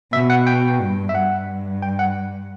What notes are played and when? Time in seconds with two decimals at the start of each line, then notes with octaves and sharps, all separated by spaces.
0.13 B2 E5
0.30 F#5
0.47 G5
0.81 G2
1.09 E5
1.14 G2 F#5
1.82 G5
1.99 F#5